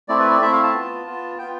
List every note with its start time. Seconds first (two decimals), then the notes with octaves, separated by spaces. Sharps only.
0.08 A3 C4 E4 D5
0.19 B4
0.30 D5
0.41 A3 C4 E4 E5
0.52 F5
0.63 A5
0.73 B3 F4
1.06 B3 F4
1.38 B3 F4 G5